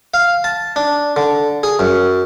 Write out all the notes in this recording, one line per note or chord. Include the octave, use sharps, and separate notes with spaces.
F5
A5
D4
D3
G#4
F#2